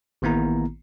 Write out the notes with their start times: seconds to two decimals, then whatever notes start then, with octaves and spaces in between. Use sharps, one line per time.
0.22 A1 D#3 A#3 B3 E4 A#5